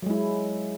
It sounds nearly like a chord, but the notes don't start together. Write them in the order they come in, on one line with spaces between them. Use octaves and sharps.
F#3 G#3 E4